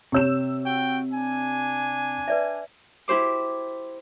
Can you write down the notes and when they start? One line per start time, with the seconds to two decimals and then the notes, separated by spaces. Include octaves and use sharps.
0.12 C3 G4 C#5 E6 E7
0.64 F#4 G5
1.14 D4 G#5
2.28 B4 D5 E5
3.08 E4 G4 C5 D6